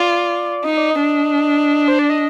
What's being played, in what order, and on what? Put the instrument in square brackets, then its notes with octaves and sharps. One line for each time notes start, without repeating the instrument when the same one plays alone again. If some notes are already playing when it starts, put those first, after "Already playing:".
Already playing: [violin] F4 [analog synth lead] D5
[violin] D#4 [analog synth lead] D#5
[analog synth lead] D5
D#5
[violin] D4
[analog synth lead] C5
D5
D#5